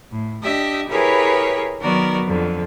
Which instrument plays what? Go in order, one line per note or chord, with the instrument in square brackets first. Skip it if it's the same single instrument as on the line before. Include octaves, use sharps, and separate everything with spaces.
[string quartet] A2
D4 G4 D#5 E5
E4 G4 G#4 A#4 B4 C#5
D#3 F#3 B3 F#4 A#4 D5
F2 D3